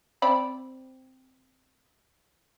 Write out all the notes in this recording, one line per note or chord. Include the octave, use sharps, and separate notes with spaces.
C4 D5 B5